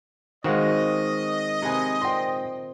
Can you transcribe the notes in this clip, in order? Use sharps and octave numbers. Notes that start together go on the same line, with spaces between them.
D#3 G#3 C4 F#4 D#5 F5
C3 A#3 B4 G#5
A#2 C4 G5 C6